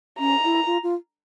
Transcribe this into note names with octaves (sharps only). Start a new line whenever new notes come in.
C#4 A#5
E4
F4
F4